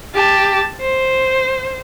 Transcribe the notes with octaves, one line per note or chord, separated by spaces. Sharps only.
G4 A5
C5